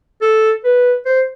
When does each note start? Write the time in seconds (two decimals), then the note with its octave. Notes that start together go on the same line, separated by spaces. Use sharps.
0.21 A4
0.64 B4
1.06 C5